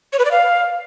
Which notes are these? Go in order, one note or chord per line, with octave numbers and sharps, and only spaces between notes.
C#5
B4
D5
F5